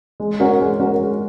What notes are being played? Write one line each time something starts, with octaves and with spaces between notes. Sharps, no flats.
G#3
C#4 F#4 A#4
G#3
C#4 F#4 A#4
G#3